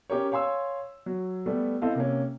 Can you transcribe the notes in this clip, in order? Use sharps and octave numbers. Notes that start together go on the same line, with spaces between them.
C#4 G4 A#4 C#5
C#5 F5 G#5 C6 E6
F#3
G3 A3 B3
C4 E4 A4 D#5 F5
C3 A#3 C#4